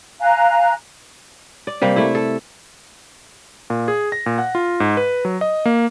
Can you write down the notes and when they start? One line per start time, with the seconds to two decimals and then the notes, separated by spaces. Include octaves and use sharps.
0.20 F5 G#5 A#5 F#6
1.67 D5
1.82 C3 G3 A#3
1.96 A3 E4
2.15 A4
3.70 A#2
3.88 G#4
4.12 A#6
4.26 A#2
4.38 F#5
4.55 F4
4.80 G#2
4.97 B4
5.25 F#3
5.41 D#5
5.65 A#3